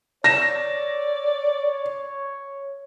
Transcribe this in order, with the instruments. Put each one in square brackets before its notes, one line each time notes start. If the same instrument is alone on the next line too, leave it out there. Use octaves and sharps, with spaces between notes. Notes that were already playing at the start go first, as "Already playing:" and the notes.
[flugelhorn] C#5 [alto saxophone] D5 [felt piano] A#6 E7